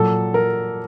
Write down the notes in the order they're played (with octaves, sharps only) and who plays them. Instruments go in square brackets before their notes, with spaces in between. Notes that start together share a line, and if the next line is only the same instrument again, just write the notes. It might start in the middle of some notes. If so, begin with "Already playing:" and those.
Already playing: [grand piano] A#2 F#3 A4
A#4